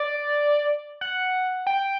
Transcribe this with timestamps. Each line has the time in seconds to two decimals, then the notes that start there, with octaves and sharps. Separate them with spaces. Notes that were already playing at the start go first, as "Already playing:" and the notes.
Already playing: D5
1.01 F#5
1.67 G5